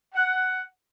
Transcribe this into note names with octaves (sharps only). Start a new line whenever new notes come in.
F#5